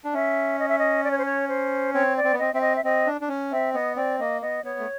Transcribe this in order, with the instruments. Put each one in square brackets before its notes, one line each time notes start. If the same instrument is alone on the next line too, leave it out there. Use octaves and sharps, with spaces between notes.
[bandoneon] D4
[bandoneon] C#4 [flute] E5
[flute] D#5
E5
D#5
D5
C#5
C5
C#5
C5
[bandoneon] C4 [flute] C#5
[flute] D5
[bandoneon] C4
B3
[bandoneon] C4 [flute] D#5
[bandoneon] C4 [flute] E5
[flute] D#5
E5
[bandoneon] C4 [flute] D#5
[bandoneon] D4
D4
C#4
[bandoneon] C4 [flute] E5
[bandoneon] B3 [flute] D#5
[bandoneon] C4 [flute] D5
[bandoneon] A#3 [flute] D#5
[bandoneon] B3 [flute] D#5
[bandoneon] B3 [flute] C#5
[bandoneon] A3